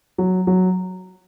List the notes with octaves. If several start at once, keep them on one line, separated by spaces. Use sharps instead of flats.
F#3
F#3